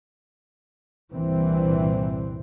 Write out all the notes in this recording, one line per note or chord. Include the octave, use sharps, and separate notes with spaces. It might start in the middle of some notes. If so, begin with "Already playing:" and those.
C2 G2 A#2 E3 C4